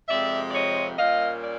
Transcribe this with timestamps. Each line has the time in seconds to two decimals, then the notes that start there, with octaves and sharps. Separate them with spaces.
0.08 F2 C3 F3 G#3 C4 D5 E5
0.49 D5
0.54 C#5 D#5
0.98 A#2 G3 A#3 C#4 D#5 F5
1.43 D5